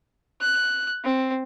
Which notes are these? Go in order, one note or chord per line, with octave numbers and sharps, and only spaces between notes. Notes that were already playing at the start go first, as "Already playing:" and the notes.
F#6
C4